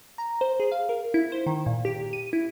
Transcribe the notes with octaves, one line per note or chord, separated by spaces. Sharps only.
A#5
C5
G#4
F5
A#4
E4
C5
D#3
A#2
G4
D#7
E4